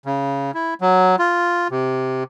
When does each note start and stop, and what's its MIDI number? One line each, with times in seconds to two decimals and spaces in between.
0.06 0.51 49
0.54 0.74 64
0.81 1.16 54
1.19 1.68 65
1.71 2.24 48